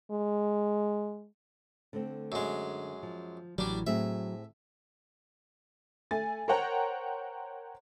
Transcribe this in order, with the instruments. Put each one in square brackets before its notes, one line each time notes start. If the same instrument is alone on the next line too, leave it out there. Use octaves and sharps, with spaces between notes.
[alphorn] G#3
[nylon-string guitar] D3 A3 C4
[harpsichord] F#2 G#3
[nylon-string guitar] F3
[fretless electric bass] A1 F#3 [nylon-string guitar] E3 [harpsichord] G3 D4
[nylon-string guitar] A2 C4 G#4 [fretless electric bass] F#3 [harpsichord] E5
[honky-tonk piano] A3 G#5 A6
A#4 C5 C#5 F#5 G5 A#5